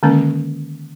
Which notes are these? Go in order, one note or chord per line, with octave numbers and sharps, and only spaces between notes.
D3 D#3 G#3 A#3 C#4